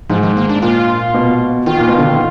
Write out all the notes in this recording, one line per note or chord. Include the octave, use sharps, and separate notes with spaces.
G#2 F3
D#3
A#3
D4
A#2 F4
B2
D#3 F4
A#2
B2
D3
D#3